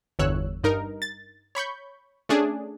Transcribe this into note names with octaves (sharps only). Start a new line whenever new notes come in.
G1 E2 C#5 E6 F#6
G2 D#4 A#4
A6
C#5 B5 C#6 G6
A3 C#4 D4 G#4